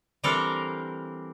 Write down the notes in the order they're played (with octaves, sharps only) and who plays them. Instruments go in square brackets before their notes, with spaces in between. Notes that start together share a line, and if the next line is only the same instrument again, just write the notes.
[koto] E3 G3 C4 D4 A4 A#4